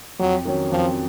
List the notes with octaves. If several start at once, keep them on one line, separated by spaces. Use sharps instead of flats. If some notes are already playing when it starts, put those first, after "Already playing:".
F2 F#3
D#3 F#3 C#4
F2 F3